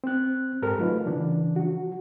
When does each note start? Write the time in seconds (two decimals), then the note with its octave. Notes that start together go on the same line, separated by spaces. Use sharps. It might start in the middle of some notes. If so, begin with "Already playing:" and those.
0.04 C4 F#6
0.62 G#2 G4 A4 A#4 C5 F6
0.79 F#3 A3 D#4 F4 B4
1.06 C#3 E3 D4
1.56 F3 F#4